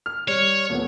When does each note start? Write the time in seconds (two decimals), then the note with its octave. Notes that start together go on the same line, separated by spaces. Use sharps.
0.06 F6
0.28 G3 C#5
0.69 D#1 A3 B3